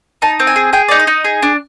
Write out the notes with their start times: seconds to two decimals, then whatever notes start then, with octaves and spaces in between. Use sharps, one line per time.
0.22 D#4 A5
0.40 C4
0.47 G#5
0.56 G#4
0.73 G#4 G5
0.89 D#4 D5
1.00 D#5
1.07 D#4
1.24 G#4
1.42 D4